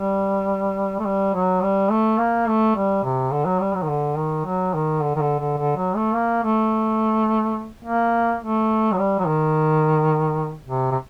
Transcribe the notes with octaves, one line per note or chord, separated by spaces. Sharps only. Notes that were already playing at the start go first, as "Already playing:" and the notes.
Already playing: G3
A3
G3
F#3
G3
A3
A#3
A3
G3
C3
D3
F#3
G3
F#3
D#3
D3
D#3
F#3
D#3
D3
D#3
D3
D3
D3
F#3
A3
A#3
A3
A#3
A3
F#3
G3
F#3
D#3
C3
C3